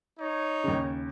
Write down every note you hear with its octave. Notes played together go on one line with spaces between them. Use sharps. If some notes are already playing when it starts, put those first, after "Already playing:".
D#4 C#5
D#2 C#3